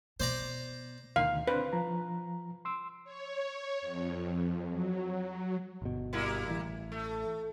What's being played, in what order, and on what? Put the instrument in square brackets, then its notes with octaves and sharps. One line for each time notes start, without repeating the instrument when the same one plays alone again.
[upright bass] B2 [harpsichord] C5 D5 A#5
[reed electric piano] D2 B2 D#3 [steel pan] F5
[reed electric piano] C4 D4 C5 [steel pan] B4
[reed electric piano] F3 A#5
C6 E6
[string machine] C#5
F2
F#3
[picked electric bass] G1 B2
[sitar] G3 A#3 E4
[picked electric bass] A1 E3
[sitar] A3